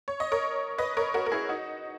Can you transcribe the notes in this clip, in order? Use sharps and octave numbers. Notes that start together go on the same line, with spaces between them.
C#5
D#5
A#4 C#5
B4 D#5
A#4 C#5
F#4 A#4
A#4
E4 G#4
D#4 F#4